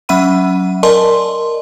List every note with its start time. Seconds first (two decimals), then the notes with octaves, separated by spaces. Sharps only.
0.09 F#3 C#4 E5 F#5 B5 D#7
0.83 A#4 D5 D#5 G#5 A5 C6